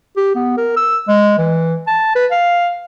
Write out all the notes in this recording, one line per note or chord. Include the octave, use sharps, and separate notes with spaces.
G4
B3
A#4
E6
G#3
E3
A5
B4
F5